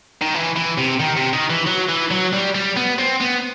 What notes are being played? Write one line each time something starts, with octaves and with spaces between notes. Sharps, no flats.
D#3
E3
E3
C3
D#3
C3
D#3
E3
F#3
E3
F#3
G3
G3
B3
C4
B3